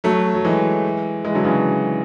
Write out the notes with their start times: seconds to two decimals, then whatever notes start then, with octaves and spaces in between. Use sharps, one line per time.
0.04 F#3 A3
0.34 F#3
0.45 E3 G#3
1.24 E3 G#3
1.35 D3 F#3
1.45 C#3 E3